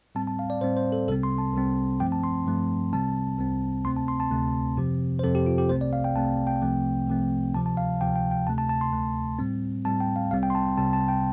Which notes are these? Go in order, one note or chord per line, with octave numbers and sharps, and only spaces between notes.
A2 G3 C4 A5
A5
F5
D5
A2 G3 C4 C5
C5
A4
C2 C3 G3 C4 A4
C6
A5
C2 C3 G3 C4
G2 F3 A3 C4 G5
A5
C6
G2 F3 A3 C4
C2 C3 G3 C4 A5
C2 C3 G3 C4
D2 C3 A3 C4 C6
A5
C6
A5
D2 C3 A3 C4
F2 C3 F3 C4
C5
F2 C3 F3 C4 A4
G4
F4
G4
C2 C3 A3 C4 C5
D5
F5
G5
C2 C3 A3 C4 A5
G5
C2 C3 F3 A3 C4
C2 C3 F3 A3 C4
D2 C3 F3 A5
A5
F5
D2 C3 F3 G5
G5
G5
D2 C3 A3 A5
A5
A5
C6
D2 C3 A3
A2 G3 C4
A2 G3 C4 A5
G5
F5
C2 C3 G3 C4 F5
G5
C6
A5
C2 C3 G3 C4 A5
A5
G5